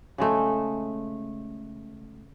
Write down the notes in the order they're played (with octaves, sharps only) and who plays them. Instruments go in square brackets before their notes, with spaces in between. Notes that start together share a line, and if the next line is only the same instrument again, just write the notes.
[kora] C#3 G#3 A3